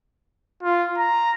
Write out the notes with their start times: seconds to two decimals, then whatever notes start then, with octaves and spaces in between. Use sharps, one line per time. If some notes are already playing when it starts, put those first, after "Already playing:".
0.63 F4
0.98 A#5